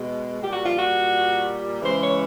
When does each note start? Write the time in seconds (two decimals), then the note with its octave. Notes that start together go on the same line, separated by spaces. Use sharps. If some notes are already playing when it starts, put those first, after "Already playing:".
Already playing: B2 G#3
0.40 A#2 G3 G4
0.51 F#4
0.63 F4
0.75 F#4
1.82 C#3 E3 G#3 C5
2.00 C#5